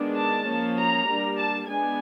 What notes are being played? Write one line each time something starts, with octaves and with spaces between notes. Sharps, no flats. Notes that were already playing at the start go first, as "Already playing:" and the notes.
Already playing: D#3 G#3 B3 D4
A5
F3 A#3 C#4
A#5
G3 A#3 D4
A5
G#3 B3 D4 G#5